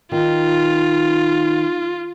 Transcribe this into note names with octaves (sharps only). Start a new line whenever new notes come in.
D#3 F4